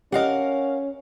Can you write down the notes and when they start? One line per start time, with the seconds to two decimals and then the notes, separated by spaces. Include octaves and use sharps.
0.12 C#4 G4 A#4 D#5 F5 F#5